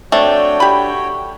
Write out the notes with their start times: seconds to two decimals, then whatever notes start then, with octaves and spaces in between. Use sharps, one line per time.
0.12 A3 C4 D4 F#4 C#5 D5 G5
0.60 G4 B5